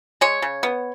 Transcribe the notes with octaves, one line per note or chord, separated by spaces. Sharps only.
G#3 C#5
C#3
B3